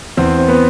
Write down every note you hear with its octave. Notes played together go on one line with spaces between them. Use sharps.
E2 C4 C5
C4
B3 B4